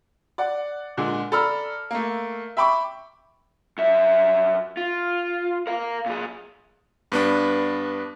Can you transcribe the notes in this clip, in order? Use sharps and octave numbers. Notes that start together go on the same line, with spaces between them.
D5 F#5
A#2 D3 G#3
A4 D5 A#5 B5 E6 F6
A3 A#3
E5 G5 B5 C#6 D6
F#2 E5
F4
A#4 F5
A#2 G#4
G2 B3 D4